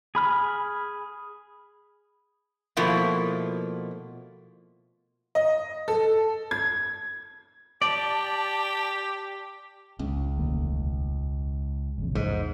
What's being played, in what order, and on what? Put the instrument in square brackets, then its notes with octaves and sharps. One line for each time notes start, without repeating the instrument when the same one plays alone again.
[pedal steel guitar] G#4 B5 F6
[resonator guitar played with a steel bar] B2 F3 A3 A#3 E4
[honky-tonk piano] D#5
A4
G#6
[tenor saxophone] G4 [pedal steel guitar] D5 [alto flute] A5
[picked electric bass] C#2 [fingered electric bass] C#4
[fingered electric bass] E1 D#2 A3
A#1 E2 C#3
[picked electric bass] G#2